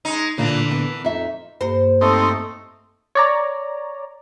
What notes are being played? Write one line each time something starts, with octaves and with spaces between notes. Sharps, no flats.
G#3 D#4
A#2 D3 E3 A#3 D4
B3
F2 D#4 E5
G2 A#3 C5
A3 C4 D#4 A4
C#5 D5 A#5